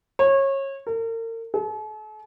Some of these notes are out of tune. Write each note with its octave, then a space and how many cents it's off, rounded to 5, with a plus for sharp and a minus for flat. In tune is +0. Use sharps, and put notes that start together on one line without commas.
C#5 -25
A#4 -40
A4 -45